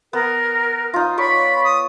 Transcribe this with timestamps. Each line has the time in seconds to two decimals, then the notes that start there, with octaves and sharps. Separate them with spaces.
0.13 B3 A#4
0.94 D#4 F4
1.18 C#5 D5 B5 C#6
1.64 D#6